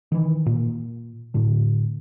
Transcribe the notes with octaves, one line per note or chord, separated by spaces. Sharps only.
D#3 E3
A#2
A2 D3